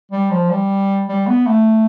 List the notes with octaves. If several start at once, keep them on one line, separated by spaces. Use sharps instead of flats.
G3
F3
G3
G3
B3
A3